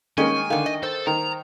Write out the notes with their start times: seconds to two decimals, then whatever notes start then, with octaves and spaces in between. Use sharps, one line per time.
0.18 D#3 G#3 A#3 C#4 G#5
0.50 D3 D#3 F5
0.66 D#5
0.83 A4 C5
1.07 D#3 A#5